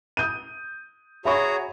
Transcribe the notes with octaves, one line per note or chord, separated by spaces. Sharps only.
D#6 G6 D#7
F#4 G#4 C#5 E5 A#5 B5 C#6